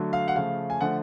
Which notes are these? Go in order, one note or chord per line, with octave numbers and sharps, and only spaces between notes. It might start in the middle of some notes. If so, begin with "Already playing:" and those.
Already playing: D3 F#3 A3
F5
F#5
C#3 F3 A3 F5
G#5
D3 F3 A3 F#5